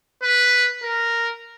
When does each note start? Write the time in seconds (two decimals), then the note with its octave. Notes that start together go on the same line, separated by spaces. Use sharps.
0.23 B4
0.83 A#4